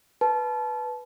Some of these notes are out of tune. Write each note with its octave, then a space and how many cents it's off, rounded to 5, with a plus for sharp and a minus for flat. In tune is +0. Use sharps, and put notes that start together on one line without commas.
B4 -5 A5 -25